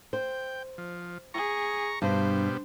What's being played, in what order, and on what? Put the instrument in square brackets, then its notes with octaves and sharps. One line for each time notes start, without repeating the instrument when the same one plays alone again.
[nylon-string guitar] C5 [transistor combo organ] G5
[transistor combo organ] F3
[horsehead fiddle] G#4 [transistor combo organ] A#5 C#6
[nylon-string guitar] G2 [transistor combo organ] B2 G3 [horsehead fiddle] C5